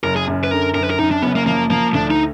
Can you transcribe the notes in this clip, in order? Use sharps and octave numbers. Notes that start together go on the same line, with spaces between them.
F#1 A#4
G#4
F#2
B4
D3 A#4
F#2 A#4
B4
A#4
F#2 D#4
D4
F#1 B3
A#3
F3 A#3
F3 A#3
D2 D4
D#4